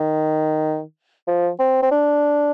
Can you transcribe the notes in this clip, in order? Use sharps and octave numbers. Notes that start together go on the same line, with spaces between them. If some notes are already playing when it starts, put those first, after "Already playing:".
Already playing: D#3
F3
C4
C4
D4